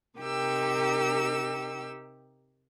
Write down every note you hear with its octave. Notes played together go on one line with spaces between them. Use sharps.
C3 D#4 G4 A#4 G5 E6